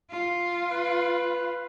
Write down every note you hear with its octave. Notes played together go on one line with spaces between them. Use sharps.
F4
B4